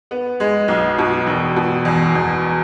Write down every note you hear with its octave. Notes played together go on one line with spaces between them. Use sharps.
B3
G#3
B1
B2
E1
B2
E2
E2